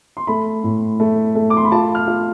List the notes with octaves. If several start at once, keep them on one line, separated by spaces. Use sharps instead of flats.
C6
A3 B5
A2
A3
A3
D6
C6
B5
F4 A5
F6
F4